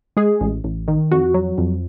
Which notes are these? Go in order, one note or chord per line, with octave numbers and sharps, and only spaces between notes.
G#3 G#4
A1
A1
D#3
F2 F#4
F#3
F2